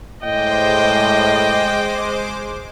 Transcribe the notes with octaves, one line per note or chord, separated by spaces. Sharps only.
A2 G#3 C5 D#5 G5 D6